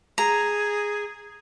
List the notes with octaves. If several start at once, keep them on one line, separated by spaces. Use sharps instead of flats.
G#4 A#5